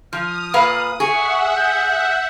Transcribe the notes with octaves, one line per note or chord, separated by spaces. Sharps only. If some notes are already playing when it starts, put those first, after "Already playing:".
F3 D#6 F6
A#2 B4 F5
G#4 E5 F#5 C#6
G6